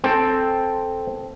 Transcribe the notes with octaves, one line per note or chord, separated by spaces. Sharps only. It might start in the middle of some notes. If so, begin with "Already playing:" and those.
C4 A4 G5